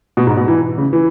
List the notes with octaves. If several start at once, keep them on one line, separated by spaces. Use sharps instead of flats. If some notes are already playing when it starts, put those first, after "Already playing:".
B2
G#2
B2
E3
C#3
E3